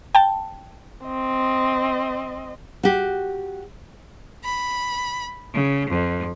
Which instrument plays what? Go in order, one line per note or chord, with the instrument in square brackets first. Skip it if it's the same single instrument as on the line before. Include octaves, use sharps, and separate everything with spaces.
[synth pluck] G5 A5
[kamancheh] C4 D#5
[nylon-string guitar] F#4 G4
[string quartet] B5
C#3
F2